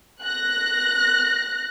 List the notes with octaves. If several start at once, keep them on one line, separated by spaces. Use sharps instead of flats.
F#6 A#6